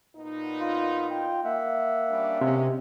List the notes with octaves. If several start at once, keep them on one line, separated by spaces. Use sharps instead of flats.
A#2 B3 D#4
F4
F4 G5
A#3 E5 F#5
G3 C#4 D4
C3 G#3 C#4